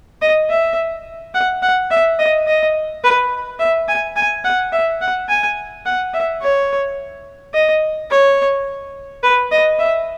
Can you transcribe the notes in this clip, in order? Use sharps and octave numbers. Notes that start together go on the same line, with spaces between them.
D#5
E5
F#5
F#5
E5
D#5
D#5
B4
E5
G#5
G#5
F#5
E5
F#5
G#5
F#5
E5
C#5
D#5
C#5
B4
D#5
E5